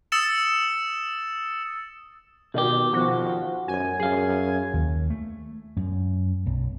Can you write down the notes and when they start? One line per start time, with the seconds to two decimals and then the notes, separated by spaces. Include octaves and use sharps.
0.12 D#6 E6 A6 C#7 E7
2.54 B2 D#3 G4
2.93 F3 F#4
3.68 F#2 G#5
4.00 F#2 G#4 F5
4.74 D#2
5.10 A3
5.76 F#2
6.46 B1